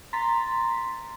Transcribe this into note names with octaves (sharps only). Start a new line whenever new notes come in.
A#5 C6 A6 B6